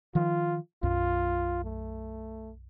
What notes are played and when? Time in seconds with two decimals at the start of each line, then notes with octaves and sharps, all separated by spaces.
0.15 D#3 F3 F4
0.83 B1 F#2 F4
1.64 A3